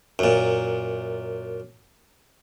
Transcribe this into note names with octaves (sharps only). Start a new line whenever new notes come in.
F#2 A#2